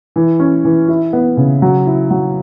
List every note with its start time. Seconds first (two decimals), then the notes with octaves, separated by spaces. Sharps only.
0.16 E3
0.40 C#4
0.65 E3
0.88 E4
1.13 B3
1.37 C#3
1.62 F#3
1.86 E4
2.10 F#3